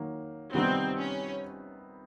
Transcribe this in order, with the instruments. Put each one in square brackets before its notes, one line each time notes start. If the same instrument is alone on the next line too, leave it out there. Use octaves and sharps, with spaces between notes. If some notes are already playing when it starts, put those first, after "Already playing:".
Already playing: [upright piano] D#3 F#3 A#3
[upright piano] C3 D#3 G3 B3 D#4 [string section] C4
[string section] C#4